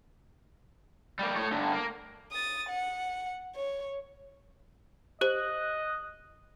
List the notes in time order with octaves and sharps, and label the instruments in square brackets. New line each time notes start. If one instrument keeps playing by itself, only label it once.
[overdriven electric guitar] G3 A#3
A3 C#5
G2 D3
A#3
[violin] D#6 A6
F#5
C#5
[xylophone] G4 C5 [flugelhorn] D#5 [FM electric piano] F#6